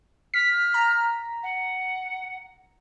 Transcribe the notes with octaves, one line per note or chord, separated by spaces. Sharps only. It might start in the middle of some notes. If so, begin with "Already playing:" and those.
F6 B6
A#5
F#5